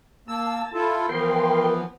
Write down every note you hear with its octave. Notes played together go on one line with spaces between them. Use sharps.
A#3 A5 E6
E4 F4 A4
E3 F3 B3 A#4 G5 C6